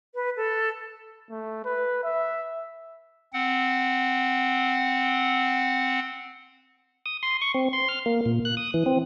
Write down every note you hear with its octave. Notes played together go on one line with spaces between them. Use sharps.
B4
A4
A3
B4
E5
C4 F#5
D#6
C6
C#6
C4
C6
F6
A#3
A#2
F#6
D#6
E3
C4